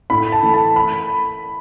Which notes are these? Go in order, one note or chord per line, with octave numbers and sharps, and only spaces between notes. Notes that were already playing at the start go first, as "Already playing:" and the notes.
A2 B5
A5
E3 A3
A5
B5